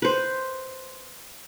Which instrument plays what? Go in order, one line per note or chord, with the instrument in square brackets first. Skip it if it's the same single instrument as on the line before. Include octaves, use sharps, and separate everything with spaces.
[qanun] B4 C5